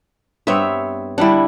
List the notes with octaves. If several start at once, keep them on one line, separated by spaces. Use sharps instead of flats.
G2 B3 C4 C#5 E5
D3 G3 D4 E4 F#5